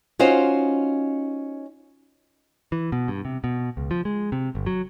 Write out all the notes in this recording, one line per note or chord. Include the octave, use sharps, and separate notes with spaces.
C#4 D#4 F4 F#4 C5
E3
B2
G2
C3
B2
C#2
F3
G#3
C3
G1
F#3